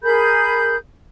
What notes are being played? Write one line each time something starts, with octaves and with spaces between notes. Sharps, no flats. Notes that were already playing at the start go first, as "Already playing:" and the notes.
G#4 A#4 B5 G6